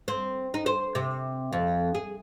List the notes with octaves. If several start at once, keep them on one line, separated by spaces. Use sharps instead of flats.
C4
D#4
C5
C3
F2
G#4